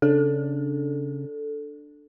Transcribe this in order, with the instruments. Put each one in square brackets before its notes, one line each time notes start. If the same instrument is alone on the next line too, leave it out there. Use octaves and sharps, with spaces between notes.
[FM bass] C#3 [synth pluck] D4 [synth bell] A4